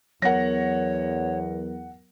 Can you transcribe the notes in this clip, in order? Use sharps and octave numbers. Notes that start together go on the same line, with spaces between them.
E2 F#3 B3 A#4 C#5 F#5 A#6